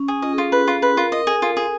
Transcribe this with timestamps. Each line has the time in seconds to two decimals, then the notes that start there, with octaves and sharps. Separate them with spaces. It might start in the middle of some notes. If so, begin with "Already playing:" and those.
Already playing: C#4
0.08 G#4
0.22 F4 D#5
0.33 G#4
0.38 F4 A4
0.52 B4
0.68 F4
0.82 B4
0.97 F4 A#4
1.12 D#5
1.27 G#4 A4
1.42 F4
1.57 G#4